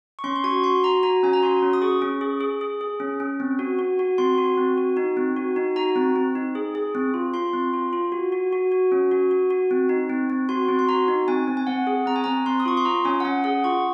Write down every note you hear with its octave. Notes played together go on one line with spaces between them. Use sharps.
C#6
C#4 C6
C6
F#4 C#6
F#4 C6
F#4 A#5
F#4 A#5
C#4 G#5
A#5
F#4 C6
C#4
D#6
G#4 C#6
C#4
G#4
G#4
G#4
G#4
C#4
C#4
C4
F#4
F#4
F#4
C4 C6
F#4
C4
F#4
D#4
C4
F#4
D#4
F#4 A#5
C4
C4
D#4
G#4
G#4
C4
F4
F4 C6
C4
F4
F4
F#4
F#4
F#4
F#4
C#4
F#4
F#4
F#4
C4
D#4
C4
C4
F#4 C6
C4
C6
F#4 A#5
D#4
C4 G#5
C4
G#5
C4 F#5
G#4
C4 A#5
G#5
C4 A#5
C4 C6
D#6
F4 C#6
C6
F4 A#5
C#4 G#5
F#5
C#4 G#5
G#4 F#5
F4 C#6